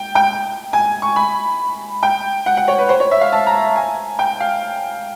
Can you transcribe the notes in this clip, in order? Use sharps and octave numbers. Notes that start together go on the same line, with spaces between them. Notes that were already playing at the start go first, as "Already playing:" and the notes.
Already playing: G5
G5
G#5
C#6
B5
G5
F#5
F#5
C#5
B4
C5
C#5
E5
F5
A5
A#5
G#5
G5
F5